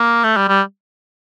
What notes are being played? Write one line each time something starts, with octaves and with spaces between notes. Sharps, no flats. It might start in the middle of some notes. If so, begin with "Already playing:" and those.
Already playing: A#3
A3
G3
G3